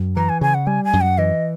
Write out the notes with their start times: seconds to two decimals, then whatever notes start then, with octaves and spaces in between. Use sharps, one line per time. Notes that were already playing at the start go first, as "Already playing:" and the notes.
Already playing: F#2
0.16 E3 A#5
0.29 G#5
0.41 C#3 G#5
0.54 F#5
0.67 G3 G#5
0.85 G#5
0.93 F#2
1.01 F#5
1.18 E3 D#5